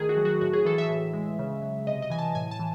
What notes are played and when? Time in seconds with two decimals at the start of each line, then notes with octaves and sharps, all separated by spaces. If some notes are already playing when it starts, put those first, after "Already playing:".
Already playing: D#3 A3 G#4
0.09 F#4
0.17 F#3
0.25 F#4
0.41 A2 F#4
0.53 G#4
0.65 E3 A4
0.78 E5
0.89 A2
1.14 G#3
1.39 C#3
1.62 F#3
1.87 C3 D#5
2.02 D#5
2.10 E3 G#5
2.19 A5
2.35 A2 G#5
2.51 A5
2.59 E3